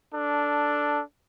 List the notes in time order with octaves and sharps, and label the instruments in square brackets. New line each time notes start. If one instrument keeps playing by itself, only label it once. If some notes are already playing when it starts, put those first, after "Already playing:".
[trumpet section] D4 A4